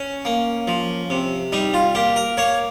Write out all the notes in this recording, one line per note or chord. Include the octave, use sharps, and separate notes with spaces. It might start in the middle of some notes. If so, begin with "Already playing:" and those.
Already playing: C#4
A#3
F3
C3
G3 D#4
F4
A#3 G4
A#4
A#3 C#5